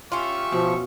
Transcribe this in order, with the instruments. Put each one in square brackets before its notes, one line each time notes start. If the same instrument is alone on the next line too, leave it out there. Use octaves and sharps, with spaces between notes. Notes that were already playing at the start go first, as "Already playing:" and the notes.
[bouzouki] C#4 F4 [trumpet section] G4 E5 C#6
[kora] B2 [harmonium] F3